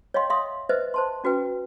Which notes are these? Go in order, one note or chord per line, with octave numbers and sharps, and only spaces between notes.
C#5 D#5 F5 G5 C6
E5 F5 C6 D#6
B4 C5 D#5 E5
C5 A5 C6
C#4 F#4 B4 G5